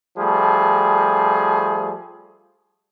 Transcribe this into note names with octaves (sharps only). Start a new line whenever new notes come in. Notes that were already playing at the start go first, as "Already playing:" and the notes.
F3 G3 A3 G#4